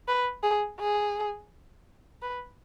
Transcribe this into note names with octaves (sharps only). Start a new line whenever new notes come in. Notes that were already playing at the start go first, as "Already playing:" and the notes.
B4
G#4
G#4
B4